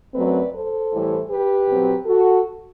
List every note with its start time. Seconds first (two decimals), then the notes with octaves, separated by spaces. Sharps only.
0.14 F#2 F#3 A3 C4 B4 D5
0.53 A4 C5
0.92 A2 E3 G3
1.29 G4 B4
1.68 B2 F#3 C4
2.06 F#4 A4